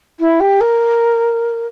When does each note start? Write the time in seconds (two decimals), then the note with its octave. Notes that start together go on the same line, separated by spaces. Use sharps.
0.19 E4
0.40 G4
0.61 A#4